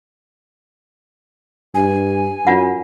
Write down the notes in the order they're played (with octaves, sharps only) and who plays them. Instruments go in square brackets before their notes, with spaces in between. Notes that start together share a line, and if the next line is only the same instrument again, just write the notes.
[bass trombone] G2 [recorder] G#5
[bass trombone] F#2 [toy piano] D4 F4 F#5